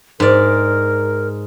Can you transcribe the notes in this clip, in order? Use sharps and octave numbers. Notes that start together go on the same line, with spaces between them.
G#2 A#4 D5